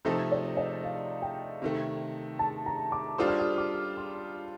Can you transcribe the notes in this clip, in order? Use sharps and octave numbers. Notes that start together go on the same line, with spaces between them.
C3 F3 A3 D#4 A4 C5
D5
D#5
F5
G5
C3 D#3 A3
A5
A#5
D6
G3 D4 F4 A4 C5 D#6
F6
D#6
D6
C6